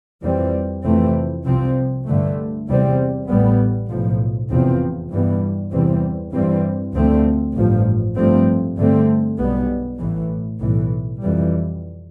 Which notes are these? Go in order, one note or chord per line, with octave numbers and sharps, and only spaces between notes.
F2 E3 G3 C4
F2 C3 E3 A3 C4
C2 C3 F3 C4
G2 D3 A3
E2 C3 G3 C4
A1 A2 G3 B3
B1 A2 F3
F1 E2 C3 F3 C4
G2 E3 G3 B3
E2 C3 E3 G3 C4
G2 E3 G3 C4
D2 D3 F3 A3 C4
A1 G2 F3
G2 F3 A3 C4
G2 D3 A3 C4
B1 B2 G3 B3
A1 A2 E3
B1 A2 E3
F2 E3 G3